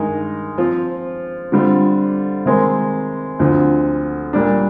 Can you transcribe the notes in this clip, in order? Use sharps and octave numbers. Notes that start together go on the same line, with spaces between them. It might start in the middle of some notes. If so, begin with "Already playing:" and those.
Already playing: G2 D#3 G#3 D#4 A#4
F3 C4 F4
D3 G3 C4 F4
C3 D#3 G#3 C4
D2 D3 F3 C4
A#2 G3 D4